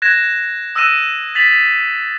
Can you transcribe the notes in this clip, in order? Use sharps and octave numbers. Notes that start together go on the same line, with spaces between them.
F#6 G#6 A#6 E7
D#6 E6 F#6 A#6 D#7 E7
A6 B6 F7 F#7